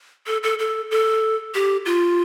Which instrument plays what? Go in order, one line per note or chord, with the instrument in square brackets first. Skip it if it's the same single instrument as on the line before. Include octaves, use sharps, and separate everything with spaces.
[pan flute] A4
A4
A4
A4
G4
F4